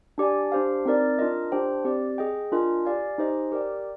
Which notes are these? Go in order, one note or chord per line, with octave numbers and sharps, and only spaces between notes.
D4 G4 D5 G#5
D4 G4 C5 F5
C4 D#4 A#4 D5
D4 F4 A#4 D#5
D4 G4 C5 G5
C4 G4 D5
G#4 D#5 G5
D4 F4 A#4 D#5 G#5
G4 D5 F5 G#5
D#4 G4 C5 D#5 G#5
G4 A#4 D5 G5